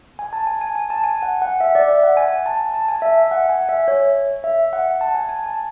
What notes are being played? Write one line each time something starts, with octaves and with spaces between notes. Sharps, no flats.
G#5
A5
G#5
G#5
G#5
A5
G#5
F#5
F#5
E5
D5
E5
F#5
G#5
A5
A5
G#5
E5
F#5
G#5
E5
C#5
E5
F#5
A5
G#5
G#5
A5